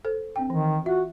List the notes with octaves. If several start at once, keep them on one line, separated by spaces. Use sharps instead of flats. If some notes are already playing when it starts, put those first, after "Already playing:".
A4 C5
C4 D4 G5
D#3 E3
F4 F#4 E5